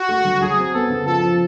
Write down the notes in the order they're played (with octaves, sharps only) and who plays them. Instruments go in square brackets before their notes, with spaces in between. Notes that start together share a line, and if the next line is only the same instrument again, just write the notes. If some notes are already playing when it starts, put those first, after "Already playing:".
Already playing: [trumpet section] F#4
[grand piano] A3
F#3
[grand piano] F#3 [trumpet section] G#4
[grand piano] C4
[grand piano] B3 [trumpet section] A4
[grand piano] C#3
[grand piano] F3 [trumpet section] A4
[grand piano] F3